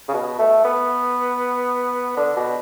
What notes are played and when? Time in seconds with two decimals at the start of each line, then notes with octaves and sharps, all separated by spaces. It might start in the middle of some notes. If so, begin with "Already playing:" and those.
0.08 C#3
0.14 B2
0.39 A3
0.65 B3
2.17 D3
2.37 B2